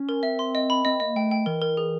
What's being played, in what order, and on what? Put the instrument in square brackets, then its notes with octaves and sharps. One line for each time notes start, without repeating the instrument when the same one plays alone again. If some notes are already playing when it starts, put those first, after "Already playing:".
Already playing: [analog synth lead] C#4
[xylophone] A#4
[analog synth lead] C4 [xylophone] E5
[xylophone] C6
D#5
B5
[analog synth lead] C4 [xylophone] D#5
[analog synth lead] A#3 [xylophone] D#5
[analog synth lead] A3 [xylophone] G5
[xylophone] G5
[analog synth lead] E3 [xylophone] A#4
[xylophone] A#4
G#4